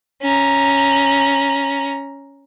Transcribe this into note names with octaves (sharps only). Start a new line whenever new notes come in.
C#4 A#5